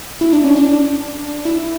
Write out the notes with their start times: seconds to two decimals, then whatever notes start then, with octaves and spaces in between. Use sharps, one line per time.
0.21 E4
0.33 D4
0.44 C#4
0.56 D4
1.45 E4